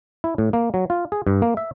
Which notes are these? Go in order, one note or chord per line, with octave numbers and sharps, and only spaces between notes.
E4
A2
A#3
F#3
F4
G#4
G2
A#3
E5